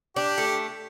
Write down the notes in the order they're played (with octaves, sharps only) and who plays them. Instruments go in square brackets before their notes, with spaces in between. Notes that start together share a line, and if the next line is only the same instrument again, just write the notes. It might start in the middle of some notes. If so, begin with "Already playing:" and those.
[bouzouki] D4 [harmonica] G4
[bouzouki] A3